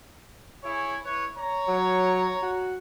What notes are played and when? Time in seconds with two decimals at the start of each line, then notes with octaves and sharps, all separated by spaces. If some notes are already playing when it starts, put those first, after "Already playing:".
0.63 E4 G#4 C#5
1.05 E4 B4 C#5
1.37 C#5 A#5
1.68 F#3
2.43 F#4